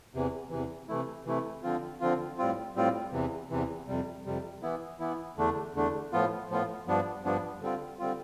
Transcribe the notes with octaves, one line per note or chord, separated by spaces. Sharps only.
E2 C3 E3
E2 C3 E3
C3 E3 A3 E4
C3 E3 A3 E4
D3 F3 C4 F4
D3 F3 C4 F4
A2 G3 C4 F4
A2 G3 C4 F4
E2 C3 E3
E2 C3 E3
F2 C3 G3
F2 C3 G3
E3 B3 E4
E3 B3 E4
E2 D3 A3 D4
E2 D3 A3 D4
A2 F3 B3 F4
A2 F3 B3 F4
G2 F3 B3 D4
G2 F3 B3 D4
D3 G3 C4 F4
D3 G3 C4 F4